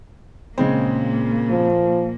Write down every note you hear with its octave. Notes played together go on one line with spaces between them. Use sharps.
A#2 C#3 G#3 A#3 C4
F3